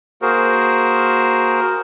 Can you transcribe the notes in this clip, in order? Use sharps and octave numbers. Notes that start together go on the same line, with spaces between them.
A#3 F#4 G#4 A#4 C5